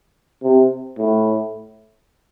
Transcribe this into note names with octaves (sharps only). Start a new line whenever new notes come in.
C3
A2